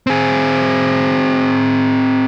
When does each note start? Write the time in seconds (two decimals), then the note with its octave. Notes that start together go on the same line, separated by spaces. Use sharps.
0.07 C4 G#4